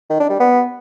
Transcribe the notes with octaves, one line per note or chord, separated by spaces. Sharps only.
D#3
D4
G3
B3